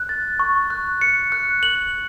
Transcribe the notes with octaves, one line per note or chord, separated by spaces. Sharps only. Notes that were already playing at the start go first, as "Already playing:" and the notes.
Already playing: F#6
A6
C#6
F#6
C#7
F#6
F#7